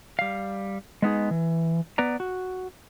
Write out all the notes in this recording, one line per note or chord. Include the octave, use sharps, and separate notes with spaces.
G3 F5
G#3 B3 D#4 G#4
E3
B3 B4 D5 A#5
F#4